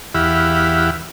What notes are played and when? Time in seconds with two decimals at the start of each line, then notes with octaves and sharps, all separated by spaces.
0.15 E2 E4 G4 F5 F#5 B5